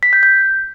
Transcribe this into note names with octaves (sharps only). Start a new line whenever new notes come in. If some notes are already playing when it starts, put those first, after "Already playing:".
B6
G6
G6